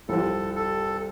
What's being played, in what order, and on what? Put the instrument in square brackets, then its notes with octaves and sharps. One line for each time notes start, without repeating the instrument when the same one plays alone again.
[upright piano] C2 C3 F3 C4 F4 [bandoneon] A4
[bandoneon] A4